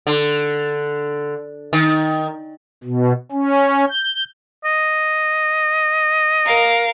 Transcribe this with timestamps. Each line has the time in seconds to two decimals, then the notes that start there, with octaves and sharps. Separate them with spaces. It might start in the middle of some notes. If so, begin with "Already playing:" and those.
0.07 D3
1.73 D#3
2.84 B2
3.32 C#4
3.89 G6
4.65 D#5
6.46 A#4 F5